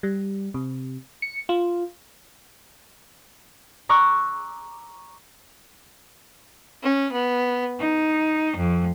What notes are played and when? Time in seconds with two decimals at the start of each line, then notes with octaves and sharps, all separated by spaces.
0.03 G3
0.54 C3
1.22 C#7
1.49 F4
3.89 A#5 C#6 D6 E6 F#6
6.83 C#4
7.12 B3
7.79 D#4
8.56 F2